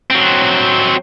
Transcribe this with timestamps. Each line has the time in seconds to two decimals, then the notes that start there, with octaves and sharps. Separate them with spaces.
0.10 F#3 C4